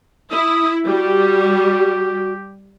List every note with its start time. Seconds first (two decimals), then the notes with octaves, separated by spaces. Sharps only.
0.31 E4 D#6
0.87 G3 F#4 G4